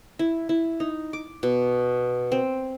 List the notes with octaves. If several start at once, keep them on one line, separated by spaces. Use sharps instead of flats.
E4
E4
D#4
D6
B2
C4